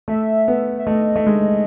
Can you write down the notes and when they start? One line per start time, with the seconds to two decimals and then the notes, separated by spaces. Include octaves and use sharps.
0.08 A3 E5
0.48 B3
0.79 E5
0.87 A3 D#5
1.16 A3
1.27 G#3